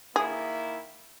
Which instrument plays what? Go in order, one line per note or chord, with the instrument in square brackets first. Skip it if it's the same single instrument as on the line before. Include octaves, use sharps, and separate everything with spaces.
[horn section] D#3 A#3 E4 [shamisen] G#4